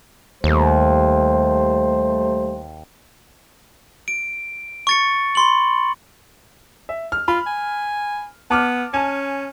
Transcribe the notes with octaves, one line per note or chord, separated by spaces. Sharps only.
D#2 G3 A3 C5
D7
C#6 A6 C#7
B5 C6 F#7
E5
F6
F4 B5
G#5
B3 A5 D6 F6
C#4 G#5 A5